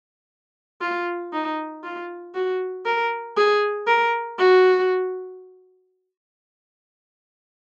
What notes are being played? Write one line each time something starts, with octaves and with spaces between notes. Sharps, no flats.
F4
D#4
F4
F#4
A#4
G#4
A#4
F#4